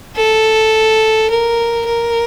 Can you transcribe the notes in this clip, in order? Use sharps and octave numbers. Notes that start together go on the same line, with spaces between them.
A4
A#4
A#4